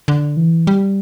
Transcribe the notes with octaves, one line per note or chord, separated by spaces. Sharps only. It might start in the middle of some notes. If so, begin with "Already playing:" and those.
D3
E3
G3